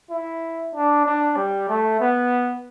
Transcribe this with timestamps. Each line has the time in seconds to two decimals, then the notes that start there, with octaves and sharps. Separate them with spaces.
0.10 E4
0.74 D4
1.05 D4
1.36 G3
1.69 A3
2.00 B3